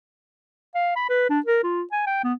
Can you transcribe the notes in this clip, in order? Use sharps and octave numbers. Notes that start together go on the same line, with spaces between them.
F5
B5
B4
D4
A#4
F4
G#5
G5
B3